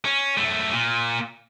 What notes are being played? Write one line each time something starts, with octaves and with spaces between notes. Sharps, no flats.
C#4
F#2 A3
A#2